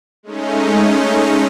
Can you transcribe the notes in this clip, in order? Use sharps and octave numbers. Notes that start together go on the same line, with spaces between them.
G#3 A3 C#4 D#4